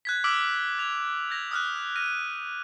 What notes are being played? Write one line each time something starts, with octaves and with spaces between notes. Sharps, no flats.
F#6 G#6 B6
D6 E6 F6 B6 D7 F#7
G#6 F7
G6 G#6 A#6 F7
D#6 F6 F#6
F6 A#6 D#7